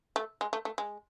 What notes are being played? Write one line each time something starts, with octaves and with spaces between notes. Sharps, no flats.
A3
G#3
A3
A3
G#3